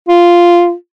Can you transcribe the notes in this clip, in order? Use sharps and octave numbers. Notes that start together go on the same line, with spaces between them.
F4